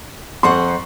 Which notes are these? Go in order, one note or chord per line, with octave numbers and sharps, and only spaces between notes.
F2 C5 F#5 C6 C#6